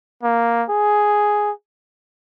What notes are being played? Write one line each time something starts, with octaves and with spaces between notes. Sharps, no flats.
A#3
G#4